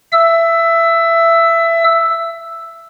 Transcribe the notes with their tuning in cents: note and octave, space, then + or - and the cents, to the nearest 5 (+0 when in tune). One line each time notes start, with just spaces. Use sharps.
E5 +20 E6 +0